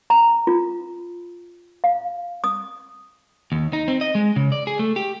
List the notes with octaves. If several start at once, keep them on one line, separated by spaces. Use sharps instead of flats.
A#5
F4
F5
D#6
D#2
D#4
C4
D#5
G#3
C#3
D5
G#4
A3
G4